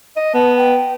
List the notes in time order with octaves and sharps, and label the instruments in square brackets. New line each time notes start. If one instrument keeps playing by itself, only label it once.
[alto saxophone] D#5
[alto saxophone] B3 [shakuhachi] A5
[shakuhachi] G5